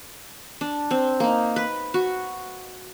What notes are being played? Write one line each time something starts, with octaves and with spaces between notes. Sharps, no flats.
D4
C4
A#3 D#4
B4
F#4